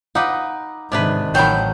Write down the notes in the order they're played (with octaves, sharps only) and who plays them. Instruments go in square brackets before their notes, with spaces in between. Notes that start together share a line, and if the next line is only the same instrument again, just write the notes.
[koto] D#4 B4 [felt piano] F5 F#5 D6
[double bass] G#2 D#3 [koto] C3 D4 B4 [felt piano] D6
[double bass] A1 [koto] D#3 F3 F#3 [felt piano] G5 B5 [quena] G6